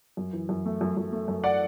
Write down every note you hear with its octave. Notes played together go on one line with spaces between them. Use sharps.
F#2
E3
F#2
A3
F#2
F#2
A3
F#2
D5 F#5